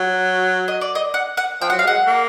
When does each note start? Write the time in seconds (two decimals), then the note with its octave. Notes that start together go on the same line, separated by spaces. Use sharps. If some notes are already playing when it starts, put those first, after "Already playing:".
Already playing: F#3
0.68 D#5
0.81 D5
0.95 D#5
1.14 F#5
1.37 F#5
1.61 F3 G5
1.70 F#3 F#5
1.79 F5
1.84 G#3 F#5
2.07 A#3